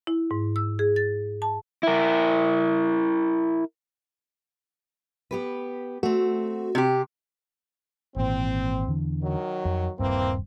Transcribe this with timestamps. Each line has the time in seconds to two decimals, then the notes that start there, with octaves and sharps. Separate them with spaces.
0.07 E4
0.31 G#2
0.56 E6
0.79 G#4
0.96 A6
1.42 A5
1.83 E4 A#4
5.31 B3 G4 B4
6.03 A3 C4 F#4
6.75 C3 G4
8.16 G#1 A#2 E3 C4
8.87 E2 D3 E3
9.23 D#3 F#3
9.65 F2
9.99 D#1 G2 E3 A#3 C4